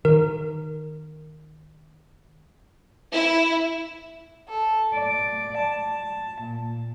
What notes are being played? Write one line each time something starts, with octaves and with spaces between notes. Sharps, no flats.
D#3 A#4
E4
A4
D5
A5
A#2